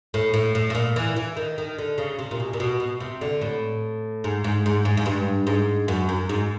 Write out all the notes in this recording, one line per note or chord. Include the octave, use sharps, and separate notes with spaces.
A2
A2
A2
A2
A#2
E3
E3
D#3
D#3
D3
C#3
C3
A#2
B2
A#2
B2
B2
C3
D3
A2
G#2
G#2
G#2
G#2
G#2
G2
G#2
F#2
F#2
G#2